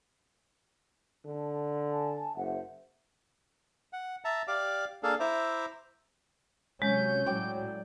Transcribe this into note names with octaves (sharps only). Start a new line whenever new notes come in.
D3 A5
G#5 A5
F#1 C5 E5 F#5
F#5
E5 A5 A#5
G4 D5 F5 D6
A#3 D4 G#4 A4 F5
E4 C5 E5 A#5 D6
C3 F#3 G#3 C#4 G6
A2 F#3 D5 G5 D6